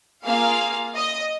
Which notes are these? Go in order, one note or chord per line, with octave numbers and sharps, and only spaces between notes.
A#3 F4 G#4 F5
D#5